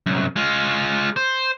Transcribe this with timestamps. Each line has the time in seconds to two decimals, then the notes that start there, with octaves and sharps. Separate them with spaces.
0.06 C2 F#2
0.36 G#3 F4
1.16 C5